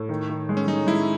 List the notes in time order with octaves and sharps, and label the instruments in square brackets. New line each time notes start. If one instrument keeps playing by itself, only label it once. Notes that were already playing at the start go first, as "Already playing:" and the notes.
Already playing: [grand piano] A2
D#3
D#3
G#3
[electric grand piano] C#4
[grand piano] G#3 [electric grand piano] D#4
[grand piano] G#3 [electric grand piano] E4